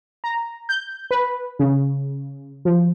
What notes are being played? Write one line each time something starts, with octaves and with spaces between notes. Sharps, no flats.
A#5
G6
B4
C#3
F3